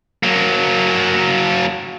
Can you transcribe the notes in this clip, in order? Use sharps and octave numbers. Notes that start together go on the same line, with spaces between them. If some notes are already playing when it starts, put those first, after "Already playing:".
F#3 A#3